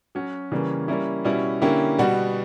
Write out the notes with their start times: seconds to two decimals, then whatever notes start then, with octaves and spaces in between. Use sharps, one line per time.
0.15 F#3 C#4 F#4
0.52 C#3 E3 G3 A#3 C#4
0.88 G3 A#3 C#4 E4
1.25 B2 G3 C#4 E4
1.62 D3 A#3 C#4 E4 G4
1.98 B2 G3 B3 F#4